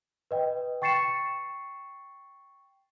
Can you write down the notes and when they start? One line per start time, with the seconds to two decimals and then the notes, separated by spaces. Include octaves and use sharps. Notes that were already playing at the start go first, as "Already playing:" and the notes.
0.31 B4 D#5 G5
0.82 G5 C#6 A6 C7 C#7 E7